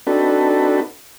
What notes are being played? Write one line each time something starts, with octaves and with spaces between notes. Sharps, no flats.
C4 D4 D#4 F#4 A4 B4